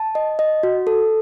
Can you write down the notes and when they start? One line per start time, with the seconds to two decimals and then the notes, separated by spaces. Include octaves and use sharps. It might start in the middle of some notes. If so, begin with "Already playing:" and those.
Already playing: A5
0.15 D#5
0.39 D#5
0.63 F#4
0.87 A4